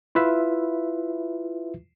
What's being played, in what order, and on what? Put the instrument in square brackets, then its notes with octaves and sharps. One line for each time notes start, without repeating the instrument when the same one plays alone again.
[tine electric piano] E4 F4 B4 E5